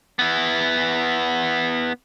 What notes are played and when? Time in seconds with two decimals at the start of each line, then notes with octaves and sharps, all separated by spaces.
0.19 B3 E4